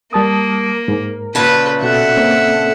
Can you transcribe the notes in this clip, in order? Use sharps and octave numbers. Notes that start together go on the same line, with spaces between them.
G3 A#3 A#4 A5 D#6
G#2
A#2 C#3 B4 A5
B2 F#4 A4 E5 F#5 F#6
A#3 C4